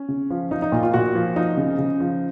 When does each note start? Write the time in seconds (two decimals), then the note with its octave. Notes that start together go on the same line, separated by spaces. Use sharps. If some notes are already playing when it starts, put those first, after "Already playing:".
Already playing: C#4
0.08 C#3
0.30 F3
0.51 F3 D#4
0.62 D#4
0.72 A#2 F4
0.83 F4
0.94 A#2 F#4
1.15 F3
1.36 F3 D#4
1.57 C#3
1.79 C#3
2.00 F3